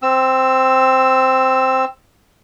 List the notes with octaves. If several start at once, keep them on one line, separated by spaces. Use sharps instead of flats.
C4 E6